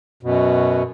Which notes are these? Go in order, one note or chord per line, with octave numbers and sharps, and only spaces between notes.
F#2 B2